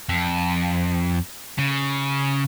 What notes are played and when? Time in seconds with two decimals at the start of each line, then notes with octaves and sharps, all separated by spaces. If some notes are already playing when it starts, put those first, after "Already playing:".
0.09 F2
1.59 C#3